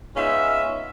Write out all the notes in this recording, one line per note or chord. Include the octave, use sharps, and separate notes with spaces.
G#3 B3 C#4 D#4 F4 E5